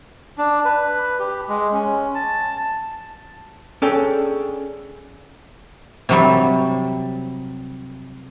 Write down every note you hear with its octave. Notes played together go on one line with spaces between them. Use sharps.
D4
B4
G4
G#3
C#4
A5
C#4 D4 G#4 A4 G5
C3 F#3 G3